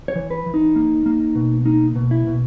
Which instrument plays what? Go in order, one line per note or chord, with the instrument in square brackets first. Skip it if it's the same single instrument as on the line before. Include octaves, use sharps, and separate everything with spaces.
[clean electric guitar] C#5
E3
B4
E3
D#4
A#3
A#3
B2
A#3 D#4
B2
E4
B2